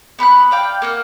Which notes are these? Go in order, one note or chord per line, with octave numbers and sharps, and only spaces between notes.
B3 B5 C#6 F#6
D5 F5 G5
A#3 F#5 F6